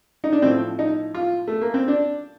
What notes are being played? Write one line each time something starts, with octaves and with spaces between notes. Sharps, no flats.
D#4
D4
A2 F3 C4
D#4
F4
A3
A#3
C4
D4